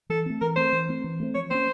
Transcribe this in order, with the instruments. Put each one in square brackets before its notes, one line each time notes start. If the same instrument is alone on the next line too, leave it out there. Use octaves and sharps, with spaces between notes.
[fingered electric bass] E3 [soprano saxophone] A4
[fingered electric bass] A3 C4
[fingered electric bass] E3 [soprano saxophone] A#4
[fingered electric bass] A3 C4 [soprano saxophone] C5
[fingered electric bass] E3
A3 C4
E3
A3 C4
[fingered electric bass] F3 [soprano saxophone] C#5
[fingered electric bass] A#3 C#4 [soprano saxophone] C5